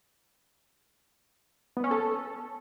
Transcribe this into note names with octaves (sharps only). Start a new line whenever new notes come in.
B3
C#4
A4